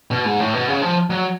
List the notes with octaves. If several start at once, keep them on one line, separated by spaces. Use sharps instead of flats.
B2
G#2
A2
B2
C#3
F3
F#3